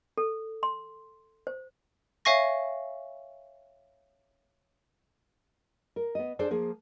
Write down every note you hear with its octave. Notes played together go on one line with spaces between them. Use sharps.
A4
C6
C5
C#5 E5 F5 G#5 C#6 A#6
A#4
B3 D#5
D4 G#4 A4 C5 D5
F3 A#3 G#4